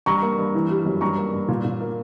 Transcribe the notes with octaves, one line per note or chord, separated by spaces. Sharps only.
G2 A#5 C#6
A#3
G2
E3
G3
F#2
G2 A#5 C#6
A#3
G2
A#2
A#2
A#3